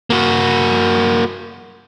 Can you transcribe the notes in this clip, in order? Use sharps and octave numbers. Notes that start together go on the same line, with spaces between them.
A#3 F#4